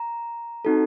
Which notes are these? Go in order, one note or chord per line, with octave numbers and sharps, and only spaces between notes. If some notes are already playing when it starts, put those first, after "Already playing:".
Already playing: A#5
C4 D#4 F#4 A4